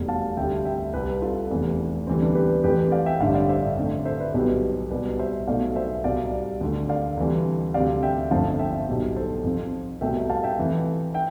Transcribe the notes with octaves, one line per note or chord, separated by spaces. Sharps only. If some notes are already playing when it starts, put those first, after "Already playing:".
Already playing: F1 E2 B2 G3
F5 A5
D2 C3 G3 E5 G5
E5 G5
C2 C3 G3 G4 B4
F4 A4
F1 E2 C3 E3
D2 C3 E3 G3 C4
B3 D4
G4 B4
F2 E3 A3 G4 B4
D5 F5
E5 G5
A1 G2 D3 G3 D5 F5
D5 F5
C5 E5
F2 D3 A3
C5 E5
B4 D5
B1 B2 G3 G4 B4
C2 B2 G3 B4 D5
C5 E5
B1 B2 A3 D5 F5
C5 E5
C2 B2 G3 D5 F5
D2 D3 A3
D5 F5
D2 C3 E3 G3
D2 C3 G3 D5 F5
E5 G5
G1 F2 D3 F3 A3 F5 A5
E5 G5
B1 B2 G3
A4 C5
F2 C3 F3
C2 B2 A3 E5 G5
F5 A5
E5 G5
F2 E3 A3
E5 G5